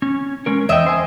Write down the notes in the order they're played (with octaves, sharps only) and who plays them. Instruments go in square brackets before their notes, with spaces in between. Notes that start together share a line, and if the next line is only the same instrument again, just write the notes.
[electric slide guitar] C#4
G#3 C#4 A#4
[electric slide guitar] E2 G5 [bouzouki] D#5 E5
[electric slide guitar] C5 G#5